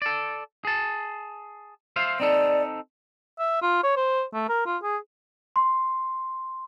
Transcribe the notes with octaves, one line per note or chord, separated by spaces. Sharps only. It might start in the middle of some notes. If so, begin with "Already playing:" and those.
A4 D5
G#4 A5
C5 E5 F5
C4 D#4 A4 D5
E5
F4
C#5
C5
A3
A#4
F4
G#4
C6